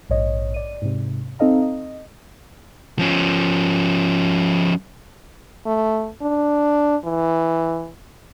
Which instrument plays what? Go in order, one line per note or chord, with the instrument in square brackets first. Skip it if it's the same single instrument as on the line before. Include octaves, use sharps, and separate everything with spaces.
[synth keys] A#1 G#2 C#5 D#5
D5 D#7
G#2 C3
C4 D#4 A4 D#5 F5 A#5
D#5
[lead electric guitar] F3 C#4
[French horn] A3
D4
E3